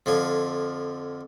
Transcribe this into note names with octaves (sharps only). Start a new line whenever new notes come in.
F2 D3 F3 G#5